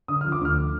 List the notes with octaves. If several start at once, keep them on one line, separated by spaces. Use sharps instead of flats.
D3 D#6
F6
F3
D6
D2 F6